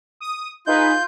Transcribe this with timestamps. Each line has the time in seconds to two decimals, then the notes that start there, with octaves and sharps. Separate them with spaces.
0.20 D#6
0.67 D#4 F4 G#4 B4 G6